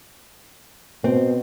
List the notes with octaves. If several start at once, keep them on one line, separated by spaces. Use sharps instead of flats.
B2 C4